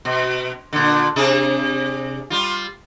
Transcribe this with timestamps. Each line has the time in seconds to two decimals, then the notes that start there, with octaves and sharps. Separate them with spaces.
0.05 B2
0.73 A#2 D3
1.16 C3 D4 G#4
2.30 G3 F4